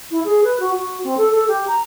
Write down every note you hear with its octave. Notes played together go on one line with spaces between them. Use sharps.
E4
G#4
B4
F#4
F#4
C4
A4
A4
G4
A#5